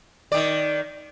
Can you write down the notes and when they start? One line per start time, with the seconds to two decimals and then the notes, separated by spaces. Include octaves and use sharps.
0.32 D#3 D5